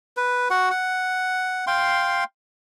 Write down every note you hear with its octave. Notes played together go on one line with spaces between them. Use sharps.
B4
F#4 F#5
F#5
F5 G5 C6